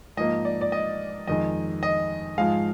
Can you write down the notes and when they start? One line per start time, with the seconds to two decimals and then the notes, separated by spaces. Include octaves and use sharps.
0.17 G#2 F3 A#3 D#5
0.45 D5
0.61 D5
0.72 D#5
1.27 F2 D#3 G#3 D#5
1.83 D#5
2.38 G#2 F3 G#3 F5